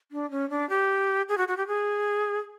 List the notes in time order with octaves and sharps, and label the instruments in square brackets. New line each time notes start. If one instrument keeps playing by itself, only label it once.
[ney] D4
C#4
D4
G4
G#4
F#4
F#4
G4
G#4